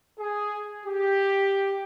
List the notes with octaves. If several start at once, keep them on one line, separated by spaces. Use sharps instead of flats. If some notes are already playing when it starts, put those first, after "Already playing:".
G#4
G4